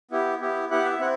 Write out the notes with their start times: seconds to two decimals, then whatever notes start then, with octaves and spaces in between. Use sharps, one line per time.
0.11 B3 E4 G4
0.41 B3 E4 G4
0.70 B3 E4 G4 F#5
0.85 E5
1.00 C4 E4 F#5